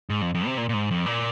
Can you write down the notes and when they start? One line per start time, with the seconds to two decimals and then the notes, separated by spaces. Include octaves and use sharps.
0.10 G#2
0.22 F2
0.34 F2
0.46 C3
0.58 A#2
0.69 A#2
0.74 G#2
0.91 F2
1.06 A#2